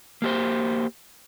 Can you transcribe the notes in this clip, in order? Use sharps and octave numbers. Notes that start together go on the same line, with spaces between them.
A#3 G4 C5